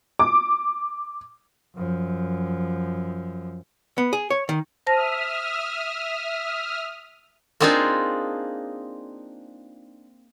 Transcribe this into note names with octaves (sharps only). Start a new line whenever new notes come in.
D6
F#2 F3
B3
G#4
C#5
D#3
C5 E5 A5 D#6 F6 A#6
A#3 C4 D4 D#4 F4 G#4